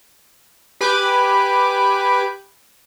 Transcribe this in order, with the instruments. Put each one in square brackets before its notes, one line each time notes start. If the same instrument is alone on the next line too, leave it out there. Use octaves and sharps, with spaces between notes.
[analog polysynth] G4 B4 G#5 B5 D6